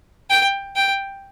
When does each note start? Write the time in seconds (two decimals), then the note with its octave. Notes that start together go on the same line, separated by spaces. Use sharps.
0.30 G5
0.76 G5